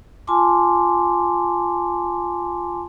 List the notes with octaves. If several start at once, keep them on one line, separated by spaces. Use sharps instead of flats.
F4 G#5 A5 C6 D6